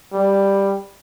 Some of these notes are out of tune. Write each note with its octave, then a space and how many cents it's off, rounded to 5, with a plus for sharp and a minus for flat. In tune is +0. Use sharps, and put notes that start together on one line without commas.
G3 +5